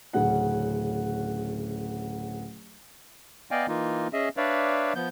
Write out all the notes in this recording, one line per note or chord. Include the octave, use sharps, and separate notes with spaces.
D1 C#3 C#4 F#5
B3 D5 D#5 F5 G5 G#5
E3 A#3 D#4 F4
C#4 G#4 D#5 E5
D4 B4 C#5 D5 E5 F5
F3 B3 G6